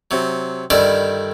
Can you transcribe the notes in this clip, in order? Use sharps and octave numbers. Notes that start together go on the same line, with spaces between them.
C3 F#3
G2 D3 D#3 E4 D5